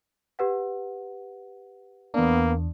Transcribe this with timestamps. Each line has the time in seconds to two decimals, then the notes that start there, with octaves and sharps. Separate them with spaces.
0.39 G4 B4 F#5
2.14 E2 A#3 B3 D4